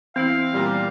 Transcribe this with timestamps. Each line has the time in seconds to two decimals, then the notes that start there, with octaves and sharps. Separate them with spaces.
0.16 E3 B3 C4 E4 F5
0.53 A#2 G3